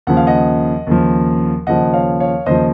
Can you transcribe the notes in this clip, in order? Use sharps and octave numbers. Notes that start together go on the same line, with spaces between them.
D#2 C#3 F3 F#5
F5
D#5 F#5
D#2 C#3 F3
D#2 C#3 F3 D#5 F#5
C#5 F5
C#5 F5
D#2 C#3 F3 C5 D#5